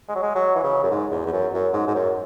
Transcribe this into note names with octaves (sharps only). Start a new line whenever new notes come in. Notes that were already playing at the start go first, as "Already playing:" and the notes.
G#3
F#3
G#3
F#3
E3
C#3
F#2
G#2
E2
E2
F#2
F#2
G#2
G#2
F#2